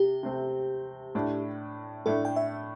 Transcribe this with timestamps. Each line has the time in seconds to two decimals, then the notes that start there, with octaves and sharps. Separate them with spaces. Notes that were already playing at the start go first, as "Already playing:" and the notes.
Already playing: C3 G4
0.23 C3 A3 C4
1.15 A2 A3 D4
2.06 A2 A3 D4 A4
2.25 G5
2.36 E5